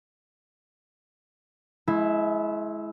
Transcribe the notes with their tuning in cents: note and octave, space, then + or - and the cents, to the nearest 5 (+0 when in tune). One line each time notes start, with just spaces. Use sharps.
G#3 +35 E4 +0